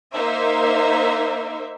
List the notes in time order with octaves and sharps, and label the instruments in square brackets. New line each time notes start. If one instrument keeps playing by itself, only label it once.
[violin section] A#3 D#4 C5 E5